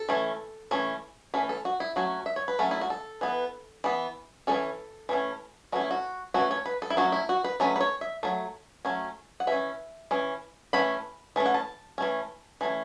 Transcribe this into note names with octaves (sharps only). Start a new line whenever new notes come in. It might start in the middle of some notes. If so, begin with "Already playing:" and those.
Already playing: A4
E3 A3 C#4
E3 A3 C#4
E3 A3 C#4 B4
A4
F#4
E4
F#3 A3 C#4 F#4
E5
C#5
B4
F#3 A3 C#4 A4
E4
F#4
A4
E3 B3
E3 B3
E3 A3 C#4 A4
E3 A3 C#4
E3 A3 C#4 F#4
E4
F#4
E3 A3 C#4 F#4
C#5
B4
A4
E4
F#3 A3 C#4 F#4
E4
F#4
B4
F#3 A3 C#4 B4
B4
C#5
E5
F#3 A3
F#3 A3 C#4
F#5
E3 C#4 E5
E3 C#4
E3 A3 C#4 B5
E3 A3 C#4
F#5
A5
E3 A3 C#4
E3 A3 C#4